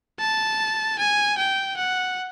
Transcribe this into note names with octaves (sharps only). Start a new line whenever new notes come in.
A5
G#5
G5
F#5